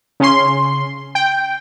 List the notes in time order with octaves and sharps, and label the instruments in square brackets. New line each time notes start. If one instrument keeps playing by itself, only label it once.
[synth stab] C#3 C#4 C6
G5